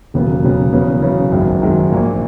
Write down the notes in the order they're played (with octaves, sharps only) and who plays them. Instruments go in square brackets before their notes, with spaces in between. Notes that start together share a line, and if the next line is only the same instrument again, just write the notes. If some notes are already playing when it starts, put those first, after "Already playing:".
[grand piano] E1 D#2 C#3 F#3 B3
E1 D#2 C#3 F#3 B3
E2 C#3 F#3 B3
E2 C#3 F#3 B3
G#1 F#2 D#3 G#3
G#1 F#2 D#3 G#3
A#1 A#2 A#3